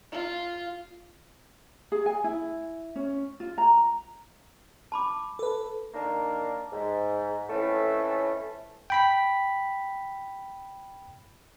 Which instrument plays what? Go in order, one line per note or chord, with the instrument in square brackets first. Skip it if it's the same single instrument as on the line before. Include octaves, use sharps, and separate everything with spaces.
[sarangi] F4
[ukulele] G#4
G#5
E4
C#4
F4
A#5
[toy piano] A5 B5 D6
[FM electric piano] A4 B4
[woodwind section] D#3 A#3 D4
G#2
F2 A2 E3 A3 C#4
[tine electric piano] G5 B5 B6